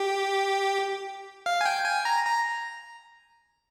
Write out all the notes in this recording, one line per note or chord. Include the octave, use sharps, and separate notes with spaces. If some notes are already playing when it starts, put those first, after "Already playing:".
Already playing: G4
F5
G#5
G5
G#5
A#5
A#5